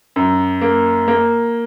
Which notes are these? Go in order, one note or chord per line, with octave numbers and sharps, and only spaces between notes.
F#2
A#3
A#3